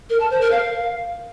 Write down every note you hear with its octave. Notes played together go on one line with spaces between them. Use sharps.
A#4
A5
C5
A#4
F5